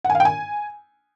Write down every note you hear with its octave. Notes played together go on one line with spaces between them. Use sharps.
F#5
G#5
F5
G5
G#5